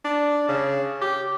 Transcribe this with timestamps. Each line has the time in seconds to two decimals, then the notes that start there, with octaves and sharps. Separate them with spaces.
0.04 D4
0.48 C#3
1.01 G4